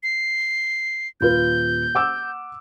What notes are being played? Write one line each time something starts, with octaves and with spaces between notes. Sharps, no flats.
C7
D#1 F4 B4 G6
F#5 D6 E6